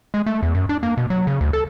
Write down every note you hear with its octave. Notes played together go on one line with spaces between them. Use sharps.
G#3
A3
E2
F#2
D4
A#3
B2
F#3
C#3
D2
A4